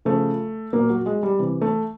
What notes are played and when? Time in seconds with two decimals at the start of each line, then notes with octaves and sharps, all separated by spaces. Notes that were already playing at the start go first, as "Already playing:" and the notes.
0.05 C#3 F3 A3
0.73 A#2 F#3 A#3
0.89 F#3
1.06 G#3
1.23 G3
1.39 C3 E3
1.61 A3